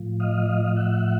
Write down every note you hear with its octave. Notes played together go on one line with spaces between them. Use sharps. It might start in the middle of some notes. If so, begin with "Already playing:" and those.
Already playing: A2 F3
D#5 F5
E5 F#5